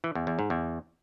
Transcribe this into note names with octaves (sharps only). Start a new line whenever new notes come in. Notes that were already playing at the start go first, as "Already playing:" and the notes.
E3
E2
E2
G#2
E2